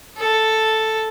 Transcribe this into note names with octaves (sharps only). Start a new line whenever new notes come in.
A4